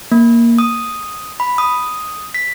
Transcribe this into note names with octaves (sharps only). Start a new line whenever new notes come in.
A#3
D#6
B5
D#6
B6